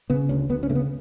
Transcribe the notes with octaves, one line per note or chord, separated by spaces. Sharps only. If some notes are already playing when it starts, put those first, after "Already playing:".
C#3 B3
D2 C#4
D2 B3
C#4
C#3 A3
B3